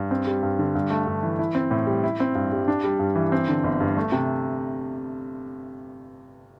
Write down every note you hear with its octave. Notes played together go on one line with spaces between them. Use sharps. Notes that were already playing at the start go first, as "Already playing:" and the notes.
Already playing: G2
C4
G3
G2
D3
G2
A3
G2
E3
E4
C4
A2
G3
E4
C4
G2
G3
D4
G3
G2
E3
C4
D3
G1
G2
A3
C3